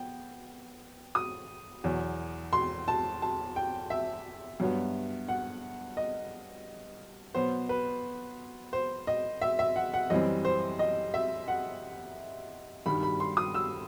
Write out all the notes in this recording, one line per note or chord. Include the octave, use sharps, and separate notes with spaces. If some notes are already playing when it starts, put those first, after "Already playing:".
Already playing: B3 G5
D#6
E2 B2 F#3
C6
A5
A5
G5
E5
G2 F#3 B3
F#5
D#5
B2 F#3 B3 C5
B4
C5
D#5
E5
E5
F#5
F#5
F#2 E3 G3 C4 D#5
C5
D#5
E5
F#5
G2 D#3 G3 B5
B5
C6
D#6
E6